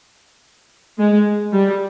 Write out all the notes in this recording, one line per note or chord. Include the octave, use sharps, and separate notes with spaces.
G#3
G3